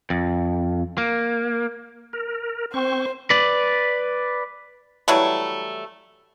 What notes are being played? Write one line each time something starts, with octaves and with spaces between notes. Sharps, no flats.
F2
A#3
A#4
C4 C5 C#6
B4 D5
E3 F#3 G3 A3